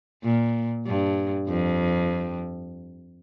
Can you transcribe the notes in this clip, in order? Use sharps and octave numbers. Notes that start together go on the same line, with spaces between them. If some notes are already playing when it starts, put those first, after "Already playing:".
A#2
G2
F2